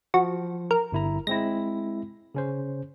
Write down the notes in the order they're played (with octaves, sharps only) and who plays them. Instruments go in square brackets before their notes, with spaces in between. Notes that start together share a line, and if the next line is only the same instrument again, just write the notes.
[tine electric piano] F3 [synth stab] F#4
[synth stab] A#4
[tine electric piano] G1 E4 A#5
[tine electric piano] G#3 C4 E4 [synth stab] A#6
[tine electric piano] C#3 C#4 C5